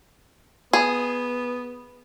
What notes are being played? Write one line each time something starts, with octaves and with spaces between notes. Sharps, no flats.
B3 G#4